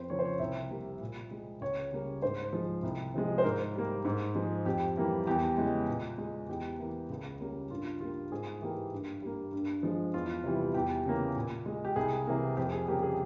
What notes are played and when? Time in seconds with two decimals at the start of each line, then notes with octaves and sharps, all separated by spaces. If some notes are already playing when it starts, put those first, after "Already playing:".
Already playing: F2 C5
0.10 C#3 F3 A#3 C#5
0.19 C5
0.25 C#5
0.39 C2 E5
0.70 C3 G3 A#3
1.01 A#2
1.31 G#3
1.61 C#2 C#5
1.92 C#3 G3 A#3
2.22 G#2 C5
2.53 F3 G#3
2.83 C2
3.14 C3 F3 G#3
3.38 C5
3.44 G#2 A#4
3.75 G3 A#3
4.05 G#2
4.35 F3 G#3
4.65 F2 G4
4.97 E3 G3 A#3
5.27 E2 G4
5.57 C#3 E3 G#3
5.88 A#2
6.18 G#3
6.48 E2 G4
6.79 E3 A#3
7.10 C#2
7.41 C#3 G3 A#3
7.70 G2 F4
8.00 G3 A#3 F4
8.32 G#2 G#4
8.61 E3 A#3 G4
8.92 G2
9.22 G3 A#3
9.52 G2
9.83 F3 G#3
10.14 E2 F4
10.44 C3 E3 G3
10.74 E2 G4
11.05 C#3 E3 A#3
11.36 A#2
11.66 G#3
11.85 G4
11.96 C2 G#4
12.27 C3 E3 A#3
12.57 F2 G4
12.72 G#4
12.88 C#3 G3 A#3 G4
13.02 G#4